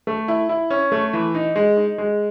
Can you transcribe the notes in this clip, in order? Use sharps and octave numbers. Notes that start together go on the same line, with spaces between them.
A3
E4
E4
C#4
A3
E3
D#4
G#3
D#4
G#3